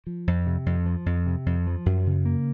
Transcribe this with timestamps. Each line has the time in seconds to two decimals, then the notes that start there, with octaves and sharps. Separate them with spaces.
0.07 F3
0.27 F2
0.47 C3
0.66 F2
0.86 F3
1.06 F2
1.26 C3
1.46 F2
1.67 F3
1.86 F#2
2.07 C#3
2.26 A#3